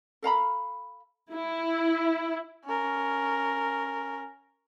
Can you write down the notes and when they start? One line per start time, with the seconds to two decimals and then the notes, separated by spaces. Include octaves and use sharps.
0.22 A4 F5 A#5 B5
1.33 E4
2.65 C#4 A#4